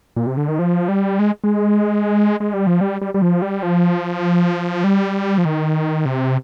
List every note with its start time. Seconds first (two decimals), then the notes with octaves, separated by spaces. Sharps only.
0.16 A#2
0.27 C3
0.37 D3
0.48 D#3
0.59 F3
0.88 G3
1.19 G#3
1.44 G#3
2.40 G#3
2.54 G3
2.67 F3
2.81 G3
3.01 G3
3.14 G3
3.22 F3
3.42 G3
3.63 F3
4.84 G3
5.38 F3
5.45 D#3
6.05 C3